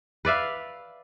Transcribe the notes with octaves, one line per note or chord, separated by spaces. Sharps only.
B4 D5 E5 F5